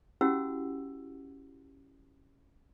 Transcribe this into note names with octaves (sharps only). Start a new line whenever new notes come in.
C#4 E4 F#4 G4 F#5 E6